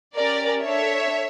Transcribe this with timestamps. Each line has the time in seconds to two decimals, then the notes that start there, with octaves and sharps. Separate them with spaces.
0.15 C#4 G4 A#4 D5
0.63 D4 A4 C#5 E5